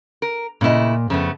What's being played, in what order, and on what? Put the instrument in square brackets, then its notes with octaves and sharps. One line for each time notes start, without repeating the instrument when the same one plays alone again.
[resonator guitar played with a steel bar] A#4
[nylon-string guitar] A#2 D#5 [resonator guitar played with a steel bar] C#3 A3 E4
[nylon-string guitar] F2 [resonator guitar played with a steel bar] C#3 A3 B3